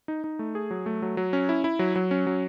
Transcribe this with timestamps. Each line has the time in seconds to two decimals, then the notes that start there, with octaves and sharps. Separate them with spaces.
0.08 D#4
0.24 D#4
0.39 A3
0.55 G#4
0.71 F#3
0.86 A3
1.02 F#3
1.17 F#3
1.33 C#4
1.49 E4
1.64 E4
1.79 F#3
1.96 F#3
2.11 C#4
2.27 F#3